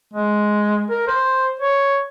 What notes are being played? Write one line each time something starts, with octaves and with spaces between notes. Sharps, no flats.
G#3
A#4
C5
C#5